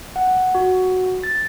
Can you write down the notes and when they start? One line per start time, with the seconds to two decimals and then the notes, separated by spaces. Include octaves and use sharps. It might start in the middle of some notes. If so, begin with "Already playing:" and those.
0.16 F#5
0.55 F#4
1.23 A6